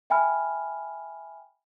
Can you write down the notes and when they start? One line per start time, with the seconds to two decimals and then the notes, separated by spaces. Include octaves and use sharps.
0.10 E5 G5 G#5 B5 F6